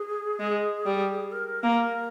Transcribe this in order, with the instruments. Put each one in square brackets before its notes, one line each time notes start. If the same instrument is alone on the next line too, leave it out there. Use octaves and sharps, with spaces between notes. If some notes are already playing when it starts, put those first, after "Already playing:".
Already playing: [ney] G#4
[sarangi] G#3
G3
[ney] A#4
[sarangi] A#3